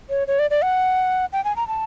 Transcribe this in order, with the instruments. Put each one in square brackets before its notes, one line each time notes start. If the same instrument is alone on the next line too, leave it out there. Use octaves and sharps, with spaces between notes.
[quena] C#5
C#5
D5
D5
F#5
G5
G#5
A#5
A5